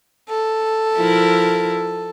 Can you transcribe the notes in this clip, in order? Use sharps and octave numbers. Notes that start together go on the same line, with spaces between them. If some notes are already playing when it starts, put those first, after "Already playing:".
A4
F3 E4 A#4